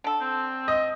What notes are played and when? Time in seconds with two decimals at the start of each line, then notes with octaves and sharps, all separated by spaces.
0.04 D3 A4
0.21 C4
0.68 D#5